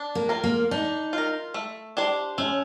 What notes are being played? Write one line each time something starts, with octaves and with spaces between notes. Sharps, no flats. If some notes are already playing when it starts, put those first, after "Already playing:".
Already playing: D4
A#3
F4 A#4
A#3
D4 D#4
F4 A#4
A3
D4 G4 C5
A3 C#4